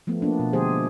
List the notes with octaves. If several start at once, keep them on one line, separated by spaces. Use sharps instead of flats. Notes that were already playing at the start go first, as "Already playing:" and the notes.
F3 A3 B3
A#3 B3 D4
B2
D3 F3 G#3 G4 G#4 C5
F3